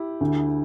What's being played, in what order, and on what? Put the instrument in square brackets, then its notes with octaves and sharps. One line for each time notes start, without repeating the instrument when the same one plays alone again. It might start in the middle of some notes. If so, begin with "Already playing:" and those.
Already playing: [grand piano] E4 G4
[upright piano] D2